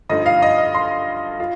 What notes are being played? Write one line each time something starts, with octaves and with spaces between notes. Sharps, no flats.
G2 D3 F3 A3 D#4 D#5
F5
D#5
D#5
C6
F4